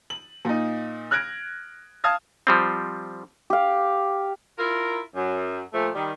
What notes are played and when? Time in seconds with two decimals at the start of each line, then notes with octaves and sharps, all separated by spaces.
0.10 F#7
0.45 A#2 D#4
1.11 F6 F#6 G#6 A#6 D7
2.04 F5 A5 D#6 F6 G#6
2.47 F3 G3 C4
3.50 G4 F5
4.58 E4 F4 A#4
5.15 F#2
5.74 A#2 F3 A3
5.95 D#3 G3